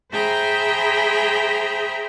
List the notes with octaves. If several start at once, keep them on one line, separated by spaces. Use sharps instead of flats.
G#4 C5 E5 G5 A#5 B5